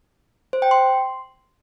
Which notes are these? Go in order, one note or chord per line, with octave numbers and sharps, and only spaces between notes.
C5
G5
C6